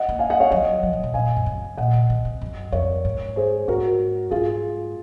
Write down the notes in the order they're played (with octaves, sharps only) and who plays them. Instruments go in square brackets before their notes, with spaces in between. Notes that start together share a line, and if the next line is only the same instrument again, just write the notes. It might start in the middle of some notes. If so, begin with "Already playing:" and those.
Already playing: [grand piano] D#5 F#5
[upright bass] A#3
[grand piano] F5 G#5
D#5 F#5
C#5 F5
[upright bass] F#3 [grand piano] D#5 F#5
[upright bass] F3
C#3
C3
[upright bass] A#2 [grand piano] F5 G#5
[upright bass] F#2
F#2
C#3
[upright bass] A#2 [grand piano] D#5 F#5
[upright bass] C#3
C#3
C3
F#2
[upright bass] F2 [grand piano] A#4 C#5
[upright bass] G#2
[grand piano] G#4 C5
[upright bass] G#2 [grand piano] F#4 A#4
[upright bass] G#2 [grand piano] F4 G#4